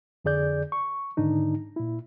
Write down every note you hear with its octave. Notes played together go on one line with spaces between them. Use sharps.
F2 D3 G#4 D5 G6
C#6
G#2 D3 D#3 D4 D#4
A#2 E4